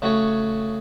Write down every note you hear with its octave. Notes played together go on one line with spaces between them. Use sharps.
C#3 A3 F#4 C#5